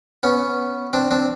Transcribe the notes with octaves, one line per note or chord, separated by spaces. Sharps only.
B3 C#4
C4 D4
C4 D4